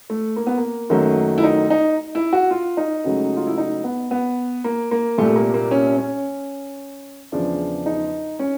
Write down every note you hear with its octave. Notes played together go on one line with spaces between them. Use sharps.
A3
A#3
B3
A#3
F#2 D#3 F#3 A3
E4
D#4
D#4
E4
F#4
F4
D#4
C#2 C#3 F#3 A3
F4
E4
D#4
B3
B3
A#3
A#3
C2 A#2 G3 A3
A#3
A#3
C#4
C#4
E2 C#3 F3 D4
D#4
C#4